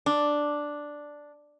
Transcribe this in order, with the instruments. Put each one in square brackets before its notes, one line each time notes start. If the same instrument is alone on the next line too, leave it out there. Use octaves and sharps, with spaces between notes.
[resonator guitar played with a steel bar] D4